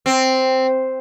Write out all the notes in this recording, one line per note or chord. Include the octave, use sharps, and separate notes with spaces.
C4